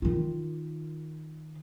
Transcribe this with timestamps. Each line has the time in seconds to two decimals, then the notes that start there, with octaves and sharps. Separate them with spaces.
0.02 D#3 F4